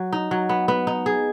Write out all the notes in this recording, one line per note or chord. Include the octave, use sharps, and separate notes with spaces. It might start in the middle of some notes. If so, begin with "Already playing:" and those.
Already playing: F#3
D#4
F#3
B3
B3
D#4
G#4